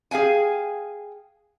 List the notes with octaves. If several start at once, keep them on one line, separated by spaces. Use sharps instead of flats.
G#4 F5 G5 G#5